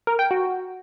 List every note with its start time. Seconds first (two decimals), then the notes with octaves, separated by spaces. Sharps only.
0.07 A#4
0.19 G5
0.31 F#4